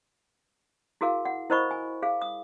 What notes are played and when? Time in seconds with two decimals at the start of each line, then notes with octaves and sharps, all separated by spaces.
1.01 E4 F#4 G#4 A#4 F5
1.25 F#5
1.50 E4 A#4 C5 D#5 B5 C#6
1.71 G#5
2.03 G#4 F5
2.22 D#6